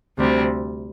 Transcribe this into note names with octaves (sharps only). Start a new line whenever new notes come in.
D2 C3 G3 C4